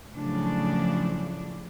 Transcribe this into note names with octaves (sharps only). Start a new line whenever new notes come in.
A2 C#3 F3 F#3 D4